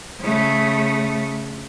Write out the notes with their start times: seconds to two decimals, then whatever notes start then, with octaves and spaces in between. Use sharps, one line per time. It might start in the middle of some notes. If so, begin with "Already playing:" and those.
0.20 C#3 A3